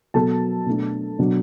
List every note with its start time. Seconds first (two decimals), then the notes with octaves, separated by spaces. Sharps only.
0.14 B2 F#3 B3 A4 A5
0.66 B2 A3 D4
1.19 B2 F#3 D4